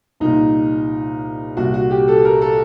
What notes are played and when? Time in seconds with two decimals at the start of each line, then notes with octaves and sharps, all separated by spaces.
0.20 C2 A#2 D#4
1.57 C2 A#2 F#4
1.74 F#4
1.91 G4
2.08 A4
2.25 A#4
2.42 A4